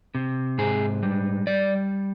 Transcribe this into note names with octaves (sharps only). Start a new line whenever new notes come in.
C3
G#2 G#4
G3
G3 D5